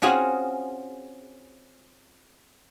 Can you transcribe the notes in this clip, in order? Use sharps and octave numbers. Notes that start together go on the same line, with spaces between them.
C4 C#4 F4 F#4 G#4